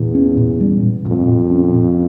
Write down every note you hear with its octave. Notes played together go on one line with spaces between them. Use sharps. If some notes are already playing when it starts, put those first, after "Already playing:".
Already playing: E2 A#2
C#4
A#2
G3
A#2
F2 A#2
A#2
C#4
A#2